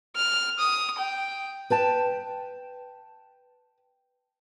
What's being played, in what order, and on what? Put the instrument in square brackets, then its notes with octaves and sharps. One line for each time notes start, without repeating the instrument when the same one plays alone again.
[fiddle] F6
D#6
G5
[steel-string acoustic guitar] B4 G5 A5